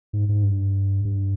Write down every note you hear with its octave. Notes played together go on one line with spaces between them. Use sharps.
G#2
G#2
G2
G2